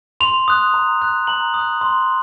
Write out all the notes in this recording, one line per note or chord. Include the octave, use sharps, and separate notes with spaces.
C6 F7
D#6 F#6
A#5
D#6 F#6
A#5 F#7
D#6
F#6
C6